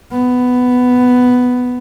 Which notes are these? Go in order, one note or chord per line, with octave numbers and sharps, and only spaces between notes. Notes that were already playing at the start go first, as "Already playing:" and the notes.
B3